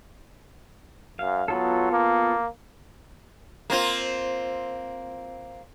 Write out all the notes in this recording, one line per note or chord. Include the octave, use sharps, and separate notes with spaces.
F#2 F5
F#3 B3 F4 A4
A#3
A#3 C4 F4